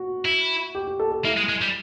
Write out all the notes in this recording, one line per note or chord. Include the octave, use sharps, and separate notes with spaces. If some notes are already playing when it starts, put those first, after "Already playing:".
Already playing: F#4
E4
G4
G4
A4
A4
A#3 E4
G#3
G#3
G3